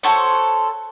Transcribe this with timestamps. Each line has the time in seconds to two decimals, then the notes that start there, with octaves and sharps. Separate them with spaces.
0.03 F#4 A4 C5 C#5